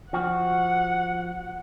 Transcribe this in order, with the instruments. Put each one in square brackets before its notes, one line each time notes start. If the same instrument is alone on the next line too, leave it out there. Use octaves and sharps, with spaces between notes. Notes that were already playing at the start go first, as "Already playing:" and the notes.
[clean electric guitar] F3 F#4 [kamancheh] F#5